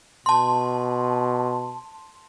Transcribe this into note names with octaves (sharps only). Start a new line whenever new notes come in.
B2 A5 C6